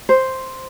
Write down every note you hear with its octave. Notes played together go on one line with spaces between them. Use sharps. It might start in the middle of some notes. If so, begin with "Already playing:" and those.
C5